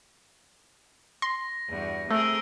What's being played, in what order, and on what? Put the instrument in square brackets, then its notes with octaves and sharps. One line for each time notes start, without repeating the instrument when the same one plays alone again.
[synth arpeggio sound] C6 [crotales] A#6
[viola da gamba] E2 G2 F#4
[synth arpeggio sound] A3 [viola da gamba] C4 G#4 A#4 [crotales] E6